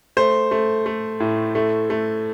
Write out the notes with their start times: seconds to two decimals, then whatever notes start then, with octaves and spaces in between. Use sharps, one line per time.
0.17 A3 C5
0.51 A3
0.86 A3
1.20 A2
1.55 A3
1.90 A3